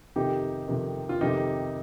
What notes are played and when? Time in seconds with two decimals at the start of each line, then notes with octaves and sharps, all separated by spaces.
0.16 F2 C3 D#3 D#4 G4
0.68 F2 C3 D#3
1.09 F4
1.21 F2 C3 D#3 D#4 G4